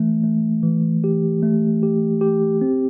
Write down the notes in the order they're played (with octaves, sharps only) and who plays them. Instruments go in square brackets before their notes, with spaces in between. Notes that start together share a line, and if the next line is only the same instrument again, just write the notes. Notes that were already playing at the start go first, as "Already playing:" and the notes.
Already playing: [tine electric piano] E3 A3
A3
E3
G4
A3
G4
G4
C4